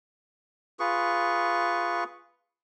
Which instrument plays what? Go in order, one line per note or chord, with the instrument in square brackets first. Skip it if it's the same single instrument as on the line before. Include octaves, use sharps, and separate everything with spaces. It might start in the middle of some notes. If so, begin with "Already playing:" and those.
[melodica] F4 G#4 B4 C#6